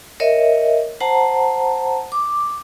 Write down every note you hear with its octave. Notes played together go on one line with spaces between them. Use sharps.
A#4 C#5 D#5 E5
C5 F#5 A5 A#5
D6